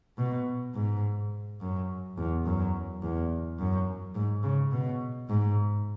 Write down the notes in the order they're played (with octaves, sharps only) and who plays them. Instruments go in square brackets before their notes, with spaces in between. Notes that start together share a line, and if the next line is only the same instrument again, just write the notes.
[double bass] B2
G#2
F#2
E2
F#2
E2
F#2
G#2
C#3
B2
G#2